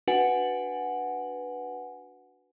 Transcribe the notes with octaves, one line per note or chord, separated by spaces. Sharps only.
D4 F#4 B4 F#5 G#5